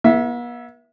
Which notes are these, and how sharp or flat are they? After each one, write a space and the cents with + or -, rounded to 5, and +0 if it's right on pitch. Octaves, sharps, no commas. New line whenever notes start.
B3 -45 E5 +0